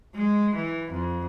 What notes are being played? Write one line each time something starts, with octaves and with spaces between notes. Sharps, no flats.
G#3
E3
F2